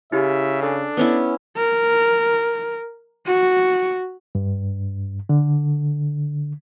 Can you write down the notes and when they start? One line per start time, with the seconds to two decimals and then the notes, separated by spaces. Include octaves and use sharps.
0.12 C#3 E4 G4 E5
0.62 D4 A4 G#5 E6
0.97 B3 C#4 E4
1.57 A#4
3.27 F#4
4.35 G2
5.29 D3